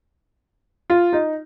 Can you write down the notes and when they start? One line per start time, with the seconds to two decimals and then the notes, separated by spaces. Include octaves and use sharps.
0.90 F4
1.13 D#4